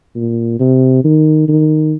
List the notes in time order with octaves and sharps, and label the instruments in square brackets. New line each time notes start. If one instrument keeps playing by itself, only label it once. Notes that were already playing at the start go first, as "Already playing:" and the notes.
[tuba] A#2
C3
D#3
D#3